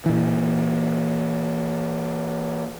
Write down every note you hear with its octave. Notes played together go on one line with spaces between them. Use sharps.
A#2 E3